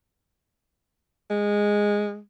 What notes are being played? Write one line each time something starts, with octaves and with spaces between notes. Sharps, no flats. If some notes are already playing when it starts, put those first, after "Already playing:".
G#3